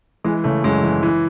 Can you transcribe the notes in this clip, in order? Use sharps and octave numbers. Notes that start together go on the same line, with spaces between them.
E3 G#3
C#3 A3
F#2 G#3
E3
E3